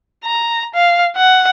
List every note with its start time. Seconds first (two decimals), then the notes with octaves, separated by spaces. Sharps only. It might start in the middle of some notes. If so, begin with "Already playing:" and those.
0.25 A#5
0.75 F5
1.17 F#5